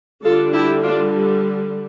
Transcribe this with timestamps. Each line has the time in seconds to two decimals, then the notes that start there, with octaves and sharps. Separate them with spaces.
0.24 D3 G3 D4 F4 A4
0.53 E4 G4
0.83 D4 F4